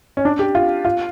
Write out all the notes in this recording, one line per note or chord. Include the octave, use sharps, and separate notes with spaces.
C#4
D4
G4
F4
F4